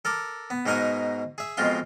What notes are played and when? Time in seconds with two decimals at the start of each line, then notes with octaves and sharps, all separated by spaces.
0.05 A4 A#4 D6
0.50 B3
0.66 G#2 B2 D#4 A#4 F#5 G#5
1.38 G#4 E5
1.57 F2 B2 G#3 F4 C6